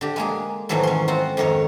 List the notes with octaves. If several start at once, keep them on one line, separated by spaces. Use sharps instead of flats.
D3 G4
G#3 A#3 G#4
G#2 B2 D#3 E3 F#3 A3
C#4 C6
C4 F4 F#4
F2 G#2 D#3 A#4 C#5